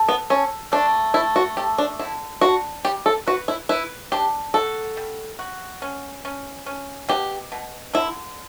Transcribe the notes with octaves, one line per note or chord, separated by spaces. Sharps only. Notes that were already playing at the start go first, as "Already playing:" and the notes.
Already playing: A4
B3
C#4 A4
A3 D4
A3 E4
F#4
G4 A4
D4
D3 E4
D4 F#4
G3 G4
A4
F#4 B4
E4
E4 B4
D4 G4
F#4 A4
G3
F#4
C#4
C#4
C#4
B2 G4
B2
D3 E4